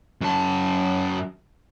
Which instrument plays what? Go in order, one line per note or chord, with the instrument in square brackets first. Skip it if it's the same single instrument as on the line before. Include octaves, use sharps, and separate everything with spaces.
[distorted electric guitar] F#2 A5